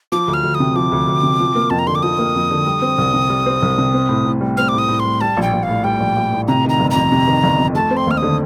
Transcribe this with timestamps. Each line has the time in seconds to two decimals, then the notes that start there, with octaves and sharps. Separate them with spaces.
0.12 F3 D6
0.28 D2
0.33 F6
0.44 D2
0.55 D#6
0.60 C3
0.75 F3 D6
0.92 D2
1.07 D2
1.23 C3
1.40 F3
1.55 A#3
1.70 F2 A5
1.79 A#5
1.87 D3 C6
1.95 D6
2.03 F3 D#6
2.18 A#3
2.35 F2
2.51 D3
2.67 G3
2.82 C4
2.98 C2
3.14 C3
3.29 G3
3.46 C4
3.62 C2
3.78 C3
3.94 C4
4.09 A2
4.25 A2
4.41 G3
4.57 C4 F6
4.68 A2 D6
4.78 D#6
4.88 A2
5.00 C6
5.05 G3
5.21 G3 A5
5.37 A#1
5.42 G5
5.53 A#1
5.63 F5
5.69 A2
5.84 G3 G5
6.00 A#1
6.16 A#1
6.33 A2
6.48 C3 A#5
6.64 D#3 A#5
6.79 G1
6.91 F2 A#5
7.12 C3
7.28 D#3
7.43 G1
7.59 F2
7.75 A3 A5
7.91 C4
7.97 C6
8.07 D#2 F6
8.17 D#6
8.22 D3